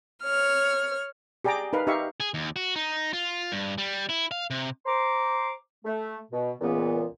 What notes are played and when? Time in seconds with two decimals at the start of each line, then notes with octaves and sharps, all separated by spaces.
0.22 C#5 F6
1.44 G4 G#4 D5 G5 A#5 D6
1.73 D#4 A#4 B4 F5
1.87 D#4 G4 E5 F5 C#6
2.20 G#4
2.34 D#2
2.56 F#4
2.76 D#4
3.13 F4
3.52 G2
3.78 G3
4.09 E4
4.31 F5
4.50 C3
4.86 C5 A#5 C6 D6
5.85 A3
6.32 B2
6.61 C#2 A#2 E3 B3